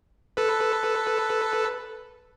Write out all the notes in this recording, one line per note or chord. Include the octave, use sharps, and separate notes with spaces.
A4 B4